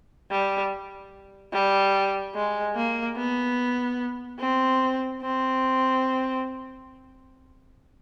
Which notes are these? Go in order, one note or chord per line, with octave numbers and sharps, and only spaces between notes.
G3
G3
G#3
A#3
B3
C4
C4